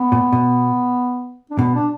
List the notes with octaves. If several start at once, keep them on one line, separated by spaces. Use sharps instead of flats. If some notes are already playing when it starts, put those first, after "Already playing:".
Already playing: B3
A#2
B2
D4
B2 B3
D4